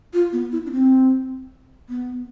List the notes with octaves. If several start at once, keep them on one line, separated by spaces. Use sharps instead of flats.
F4
B3
E4
D4
C4
B3